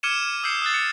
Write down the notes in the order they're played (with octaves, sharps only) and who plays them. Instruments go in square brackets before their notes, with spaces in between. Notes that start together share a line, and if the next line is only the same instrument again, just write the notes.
[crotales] D6 F6 G#6 C#7 D#7 E7
D#6 E6 G6 C7 C#7 D#7
D#6 F#6 A6
C#7